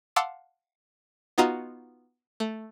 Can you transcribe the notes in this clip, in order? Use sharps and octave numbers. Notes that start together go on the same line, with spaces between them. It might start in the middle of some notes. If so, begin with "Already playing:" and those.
F5 F#5 A5 C6 D6 E6
B3 D#4 F4 F#4 D#5 A#5
A3